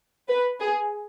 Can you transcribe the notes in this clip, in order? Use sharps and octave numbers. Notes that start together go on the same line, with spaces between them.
B4
G#4